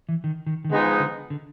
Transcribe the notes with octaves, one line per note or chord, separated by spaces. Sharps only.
E3
D#3
D#3
D#3
D3 F3 G#3 B3 D#4 G#4
D3
D3